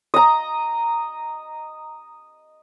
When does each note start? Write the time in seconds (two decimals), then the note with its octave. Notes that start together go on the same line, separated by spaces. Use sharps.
0.14 D#5 A#5